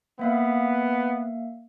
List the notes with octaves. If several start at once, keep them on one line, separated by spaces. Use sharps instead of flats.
A#3 B3 E5 F5